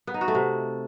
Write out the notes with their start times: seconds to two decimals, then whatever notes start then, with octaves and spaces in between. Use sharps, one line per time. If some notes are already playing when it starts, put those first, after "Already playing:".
0.07 B3
0.14 D#4
0.21 F#4
0.28 A3
0.35 C3